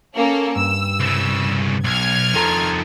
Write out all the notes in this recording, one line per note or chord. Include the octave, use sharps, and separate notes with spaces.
A#3 C#4 A4
G2 E6
C2 C#3
B1 F6 G#6
F2 D#3 F3 A4 A#5